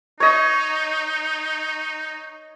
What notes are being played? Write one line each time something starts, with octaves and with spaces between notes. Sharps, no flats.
D#4 C#5 D#5